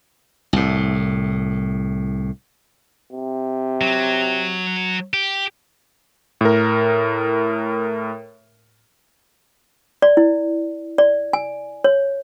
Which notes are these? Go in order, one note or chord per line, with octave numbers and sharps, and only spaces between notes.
C2 A2
C3
F#3
G4
A2 A#4
D5
E4
D5
G#5
C#5